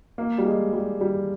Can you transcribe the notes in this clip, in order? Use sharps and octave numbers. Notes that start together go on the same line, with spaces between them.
A#3
G3
G#3
G3
G3